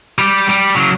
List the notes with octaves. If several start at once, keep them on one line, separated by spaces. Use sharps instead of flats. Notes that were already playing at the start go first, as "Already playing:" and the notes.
G3 G4
G3
C#3 F#3